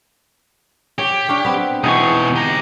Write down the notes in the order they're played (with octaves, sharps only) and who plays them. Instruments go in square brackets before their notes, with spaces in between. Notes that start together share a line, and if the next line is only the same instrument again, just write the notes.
[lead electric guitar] G4 [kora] C#5
[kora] D4 C#5 F5
B3 C4
[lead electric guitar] B2 E3 [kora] G#3 [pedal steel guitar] D#4 G#4 C#6
[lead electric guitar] G4 A#5